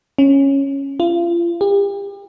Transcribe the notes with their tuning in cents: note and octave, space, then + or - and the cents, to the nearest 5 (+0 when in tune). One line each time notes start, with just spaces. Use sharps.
C#4 -10
F4 -35
G4 +35